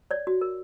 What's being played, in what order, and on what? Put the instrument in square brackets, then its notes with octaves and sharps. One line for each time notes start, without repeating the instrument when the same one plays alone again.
[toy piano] C#5 D5
F#4
A#4